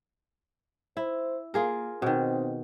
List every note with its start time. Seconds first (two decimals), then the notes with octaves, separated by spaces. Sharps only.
0.97 E4 C5
1.54 A#3 F4 G#4 A#4
2.02 B2 D#3 C4